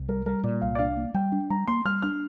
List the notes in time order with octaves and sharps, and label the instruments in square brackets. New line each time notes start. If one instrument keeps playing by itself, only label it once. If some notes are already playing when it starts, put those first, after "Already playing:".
Already playing: [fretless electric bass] C2
[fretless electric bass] G3 [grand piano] A#4
[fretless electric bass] G3 [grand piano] A#4
[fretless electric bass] A#2 [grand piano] D5
[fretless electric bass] C2 [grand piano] F5
[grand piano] D5
[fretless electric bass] D4 [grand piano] F5
[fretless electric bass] A#3
[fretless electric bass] G3 [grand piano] G5
[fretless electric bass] D4
[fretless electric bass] G3 [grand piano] A#5
[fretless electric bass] A#3 [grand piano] C6
[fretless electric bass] G3 [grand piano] F6
[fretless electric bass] D4 [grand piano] F6